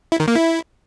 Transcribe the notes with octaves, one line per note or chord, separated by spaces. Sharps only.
E4
D#3
A#3
E4